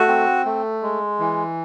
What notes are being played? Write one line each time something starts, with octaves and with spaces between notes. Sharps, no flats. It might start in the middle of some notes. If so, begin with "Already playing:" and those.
Already playing: A3 F#4
C4
A3
G#3
E3